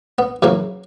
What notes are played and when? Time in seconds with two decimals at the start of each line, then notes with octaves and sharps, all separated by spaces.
0.18 B3
0.42 F#2 C#3 E3 A#3